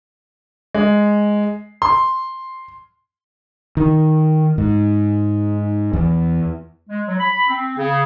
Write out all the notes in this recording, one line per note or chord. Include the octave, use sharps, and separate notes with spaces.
G#3
C6
D#3
G#2
E2
G#3
F#3
B5
C4
C#3